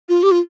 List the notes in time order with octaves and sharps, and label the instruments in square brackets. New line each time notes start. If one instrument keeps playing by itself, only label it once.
[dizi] F4
G4
F4